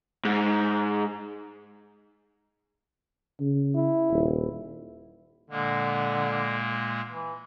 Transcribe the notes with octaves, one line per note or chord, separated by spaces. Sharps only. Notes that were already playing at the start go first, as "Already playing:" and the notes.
G#2
C#3
E4
D#1
A#2 D3 G#3 A#3
E3